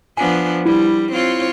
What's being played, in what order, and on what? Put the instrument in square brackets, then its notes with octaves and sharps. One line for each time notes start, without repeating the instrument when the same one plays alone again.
[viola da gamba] F3 B3 D4 [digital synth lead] G#5
[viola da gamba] G3 [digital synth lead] E4
[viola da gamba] C4 F4 C#5